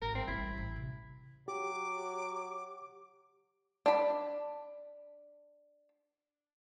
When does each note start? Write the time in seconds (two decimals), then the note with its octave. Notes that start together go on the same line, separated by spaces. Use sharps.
0.02 G#1 G2 A#4
0.15 C4
0.28 A1 G3 E4
0.58 A1
0.76 C3
1.48 F#3 G4 D6
3.86 D4 B5